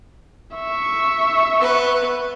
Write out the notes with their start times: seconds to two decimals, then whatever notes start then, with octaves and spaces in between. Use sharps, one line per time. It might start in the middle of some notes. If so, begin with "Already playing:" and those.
0.56 E5 C#6
1.60 B3 B4